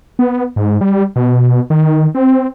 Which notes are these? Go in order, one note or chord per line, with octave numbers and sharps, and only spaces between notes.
B3
G#2
G3
B2
D#3
C4